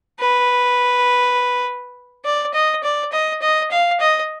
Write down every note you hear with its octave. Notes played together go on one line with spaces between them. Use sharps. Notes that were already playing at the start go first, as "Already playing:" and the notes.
B4
D5
D#5
D5
D#5
D#5
F5
D#5